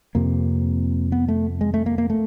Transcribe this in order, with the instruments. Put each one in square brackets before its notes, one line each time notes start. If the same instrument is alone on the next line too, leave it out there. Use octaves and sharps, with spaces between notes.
[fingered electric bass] F2 C3 A#3
B3
A3
G#3
A3
A#3
A#3
A3